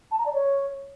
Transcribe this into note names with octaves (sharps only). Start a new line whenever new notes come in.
A5
A#5
D5
C#5